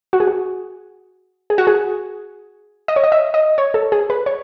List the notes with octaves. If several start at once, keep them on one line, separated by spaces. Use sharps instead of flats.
F#4
G#4
F#4
G#4
F#4
G#4
D#5
C#5
D#5
E5
D#5
C#5
A4
G#4
B4
C#5